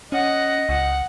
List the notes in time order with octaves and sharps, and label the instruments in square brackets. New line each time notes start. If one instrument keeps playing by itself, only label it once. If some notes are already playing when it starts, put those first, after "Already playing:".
[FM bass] C#4 [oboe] D#5 [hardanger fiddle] F#5
[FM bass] C#2 [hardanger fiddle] F#5